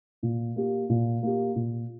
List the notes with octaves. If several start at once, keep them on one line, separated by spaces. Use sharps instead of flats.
A#2
A#3 G4
A#2
A#3 G4
A#2